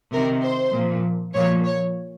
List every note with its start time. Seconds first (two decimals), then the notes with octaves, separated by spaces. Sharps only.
0.13 C3 D#3 A#4
0.43 C5
0.74 A#2 F3
1.34 A#2 F3 C#5
1.65 C#5